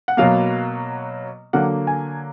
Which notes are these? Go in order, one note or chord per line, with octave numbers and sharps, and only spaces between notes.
F#5
B2 F#3 A#3 F5
D3 F#3 A#3 F#5
G#5